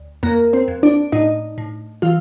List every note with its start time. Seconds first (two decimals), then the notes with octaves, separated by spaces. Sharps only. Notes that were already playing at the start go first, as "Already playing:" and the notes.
Already playing: D2
0.23 F2 A#3 A#4
0.53 C4 C5
0.68 F2
0.83 D4 D5
1.12 A2 D#4 D#5
1.58 A2
2.02 E3 F4 F5